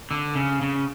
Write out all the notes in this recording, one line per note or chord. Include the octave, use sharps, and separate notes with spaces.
D3
C#3
C#3